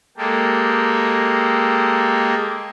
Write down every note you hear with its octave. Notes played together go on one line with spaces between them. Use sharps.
G#3 A#3 G4 A4